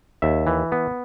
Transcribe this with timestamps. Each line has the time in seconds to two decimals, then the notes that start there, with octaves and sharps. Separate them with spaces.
0.22 D#2 E5
0.47 E3
0.72 B3